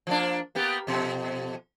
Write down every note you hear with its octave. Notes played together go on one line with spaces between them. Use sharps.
F3 A#3 D4
A#3 B3 G4
F2 B2